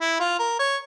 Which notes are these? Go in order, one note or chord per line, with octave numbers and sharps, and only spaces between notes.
E4
F4
A#4
C#5